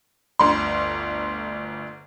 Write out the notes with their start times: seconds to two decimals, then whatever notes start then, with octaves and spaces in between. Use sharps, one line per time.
0.39 G1 D2 C6